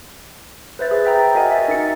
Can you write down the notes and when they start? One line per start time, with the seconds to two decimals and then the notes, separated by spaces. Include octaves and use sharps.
0.79 B4 C5 E5 A6
0.91 G#4 B4 E5
1.05 E5 G5 A#5
1.35 F#4 A#4 D#5 E5 F#5 G#5
1.51 E5 A6
1.68 D#4 A#4 D#5 A6 C#7